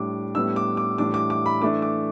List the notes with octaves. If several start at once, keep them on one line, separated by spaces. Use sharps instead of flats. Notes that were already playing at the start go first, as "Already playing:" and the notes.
Already playing: A2 G3 D4 D6
A2 G3 B3 D4 E6
D6
D6
A2 E3 G3 D4 D6
D6
D6
B5
E3 A3 D4 D6
D6